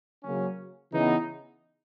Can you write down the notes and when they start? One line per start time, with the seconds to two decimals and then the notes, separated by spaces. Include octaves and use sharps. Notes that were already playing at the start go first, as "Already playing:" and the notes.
0.23 C#3 F#3 A#3 C#4
0.93 C#3 E3 B3 D#4